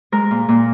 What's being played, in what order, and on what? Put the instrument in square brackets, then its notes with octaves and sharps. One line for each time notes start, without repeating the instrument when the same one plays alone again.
[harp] G#3 A#4
A#2
A#2